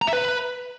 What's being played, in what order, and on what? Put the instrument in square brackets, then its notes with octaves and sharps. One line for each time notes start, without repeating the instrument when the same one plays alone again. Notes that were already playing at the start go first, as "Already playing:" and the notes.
[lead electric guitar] A#5
E5
B4